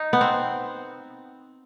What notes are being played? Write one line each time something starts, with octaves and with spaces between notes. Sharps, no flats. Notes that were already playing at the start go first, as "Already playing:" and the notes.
Already playing: D#4
B3
C4